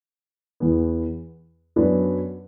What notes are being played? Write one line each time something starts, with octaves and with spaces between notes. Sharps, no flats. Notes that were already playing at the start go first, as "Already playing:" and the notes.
E2 E3 B3
F#2 F#3 B3 D4 B4